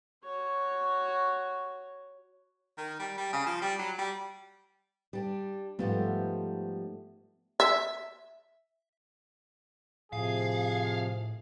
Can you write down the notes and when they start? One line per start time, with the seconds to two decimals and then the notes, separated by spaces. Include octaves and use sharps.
0.24 F#4 C#5
2.78 D#3
2.99 G3
3.18 G3
3.33 C#3
3.47 F3
3.62 G3
3.79 F#3
3.98 G3
5.13 G3 D4
5.79 G#2 F3 G3 A3 B3
7.60 E5
10.13 A2 C3 F3 G#4 F5